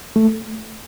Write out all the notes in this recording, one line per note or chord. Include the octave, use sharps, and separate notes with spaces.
A3